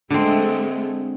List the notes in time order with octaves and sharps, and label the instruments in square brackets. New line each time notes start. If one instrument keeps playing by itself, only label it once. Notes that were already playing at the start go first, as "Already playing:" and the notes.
[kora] D3 C4 [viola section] G#3 A3